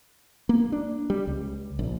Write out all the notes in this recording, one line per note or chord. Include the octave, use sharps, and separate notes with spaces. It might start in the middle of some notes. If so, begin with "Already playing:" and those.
A#3
D4
G3
C#2
A#1